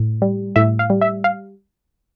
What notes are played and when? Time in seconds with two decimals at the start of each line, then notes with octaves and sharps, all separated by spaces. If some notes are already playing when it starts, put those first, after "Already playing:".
Already playing: A2
0.22 G3
0.56 A2 E5
0.79 F5
0.90 G3
1.01 E5
1.24 F5